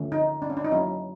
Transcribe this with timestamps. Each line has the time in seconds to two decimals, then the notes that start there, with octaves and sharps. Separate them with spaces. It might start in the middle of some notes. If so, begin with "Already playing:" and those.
Already playing: D3 F3 A3 C#4
0.12 D#4
0.42 D4
0.50 C#4
0.57 D4
0.65 D#4
0.72 F#3 A#3 C#4 E4